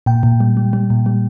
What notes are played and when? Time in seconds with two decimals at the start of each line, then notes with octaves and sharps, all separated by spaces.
0.06 A#2 G5
0.23 A#2
0.40 G3
0.57 G3
0.73 G3
0.90 A#2
1.06 G3